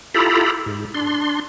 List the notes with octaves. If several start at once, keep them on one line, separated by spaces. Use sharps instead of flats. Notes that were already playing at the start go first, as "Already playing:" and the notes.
E4 F4 G4 A4 A#5 B5
G#2
D4 C6